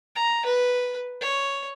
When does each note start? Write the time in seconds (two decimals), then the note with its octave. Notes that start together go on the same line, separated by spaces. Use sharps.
0.16 A#5
0.45 B4
1.21 C#5